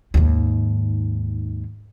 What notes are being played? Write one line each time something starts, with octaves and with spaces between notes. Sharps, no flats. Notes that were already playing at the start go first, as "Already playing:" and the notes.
D#2 G#2